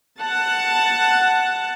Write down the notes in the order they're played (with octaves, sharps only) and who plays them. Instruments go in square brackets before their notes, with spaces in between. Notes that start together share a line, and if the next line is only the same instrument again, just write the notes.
[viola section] F#5 A5